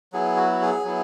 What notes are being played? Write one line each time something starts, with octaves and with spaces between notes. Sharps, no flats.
F#3 B3 E4 G#4
F#4
F#4
G#4
F#3 B3 E4